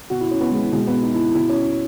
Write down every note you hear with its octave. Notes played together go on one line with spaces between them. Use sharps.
B2 F#4
E4
C#4
B3
G#3
E3
B2 G#3
B3
D#4
E4
B2 E4
C#4